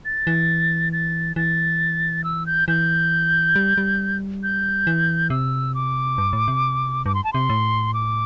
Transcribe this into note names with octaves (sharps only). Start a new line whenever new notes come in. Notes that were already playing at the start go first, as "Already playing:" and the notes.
A6
E3
A6
E3 A6
E6
G6
E3 G6
G3
G3
G6
E3
C3 E6
D6
G2
A2
C3
G2 D6
C6
A5
C3 C6
A2
D6